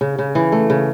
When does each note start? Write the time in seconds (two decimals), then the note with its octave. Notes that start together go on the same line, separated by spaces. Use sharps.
0.01 C#3
0.19 C#3
0.35 E3
0.52 A3
0.70 C#3